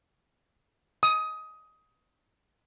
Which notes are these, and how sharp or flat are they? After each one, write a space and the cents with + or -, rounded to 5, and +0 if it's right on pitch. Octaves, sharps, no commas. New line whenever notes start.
D#6 +20